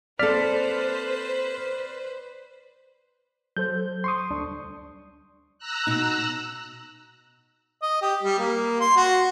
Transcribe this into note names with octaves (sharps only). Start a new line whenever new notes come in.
A#3 C4 A4 B4 C5 D5 F6 B6
F#3 A4 C5 G6
C6 C#6 D#6
D2 G3 D4
A#5 E6 F#6
B2 D#4
D#5
G4
G3
A#3
C6
F#4